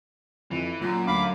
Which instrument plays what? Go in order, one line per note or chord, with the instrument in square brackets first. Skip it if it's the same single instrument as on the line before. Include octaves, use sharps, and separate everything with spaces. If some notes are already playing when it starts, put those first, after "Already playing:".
[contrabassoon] F2 [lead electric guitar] E3
[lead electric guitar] F#2 [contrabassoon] A#2
[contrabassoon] D2 [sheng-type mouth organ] F5 B5 D6